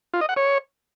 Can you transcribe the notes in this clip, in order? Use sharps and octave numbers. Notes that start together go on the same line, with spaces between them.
F4
D#5
F#5
C#5